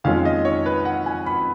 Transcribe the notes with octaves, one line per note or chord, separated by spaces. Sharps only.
F2 D#3 G#3 C#4 F4 F5
D#5
C#5
B4
F#5
G#5
B5